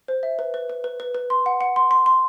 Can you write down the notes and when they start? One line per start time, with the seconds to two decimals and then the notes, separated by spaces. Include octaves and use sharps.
0.08 C5
0.23 E5
0.39 B4
0.54 B4
0.70 B4
0.84 B4
1.00 B4
1.15 B4
1.30 C6
1.46 F#5
1.61 F#5
1.76 C6
1.91 C6
2.06 C6